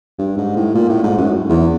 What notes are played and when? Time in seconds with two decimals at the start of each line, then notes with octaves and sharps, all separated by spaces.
0.19 G2
0.37 G#2
0.56 A2
0.75 A#2
0.89 A2
1.03 G#2
1.17 F#2
1.49 E2